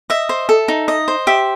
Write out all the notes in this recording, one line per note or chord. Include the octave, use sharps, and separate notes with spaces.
D#5 E5
C5
A4
D#4
D#5
C5
G4 E5